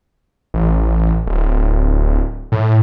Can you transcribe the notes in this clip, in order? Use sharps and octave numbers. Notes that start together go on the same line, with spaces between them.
A1
D1
A2